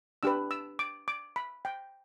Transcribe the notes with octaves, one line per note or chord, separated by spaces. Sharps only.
D4 G4 B4 E6
E6
D6
D6
B5
G5